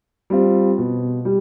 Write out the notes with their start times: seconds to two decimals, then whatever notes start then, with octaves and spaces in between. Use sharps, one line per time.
0.30 G3 C4 F4
0.78 B2
1.25 G3